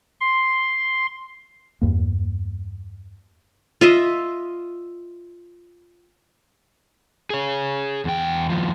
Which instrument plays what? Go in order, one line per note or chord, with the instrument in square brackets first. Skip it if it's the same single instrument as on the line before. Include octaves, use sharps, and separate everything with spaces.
[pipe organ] C6
[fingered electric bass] E2 G2 A#3
[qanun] F4 D#5 E5
[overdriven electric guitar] G#4 C#5
E2 G5
D#2 F3